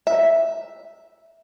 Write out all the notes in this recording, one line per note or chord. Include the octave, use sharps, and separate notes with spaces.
E5